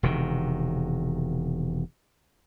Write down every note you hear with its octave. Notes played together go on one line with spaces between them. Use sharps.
E1 C3 D#3